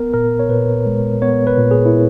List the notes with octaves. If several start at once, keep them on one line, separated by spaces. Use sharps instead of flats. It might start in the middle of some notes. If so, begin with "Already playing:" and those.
Already playing: B3 A#4
A#2 A#4
C#5
A#2 B4
G#3
B3 C#5
B4
A#2
G#4
E4